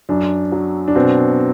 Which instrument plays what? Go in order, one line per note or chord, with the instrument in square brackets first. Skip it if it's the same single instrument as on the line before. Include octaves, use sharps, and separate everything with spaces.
[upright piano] F#2 [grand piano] D4
[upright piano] F#3
[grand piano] D4
[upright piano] B2 [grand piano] C4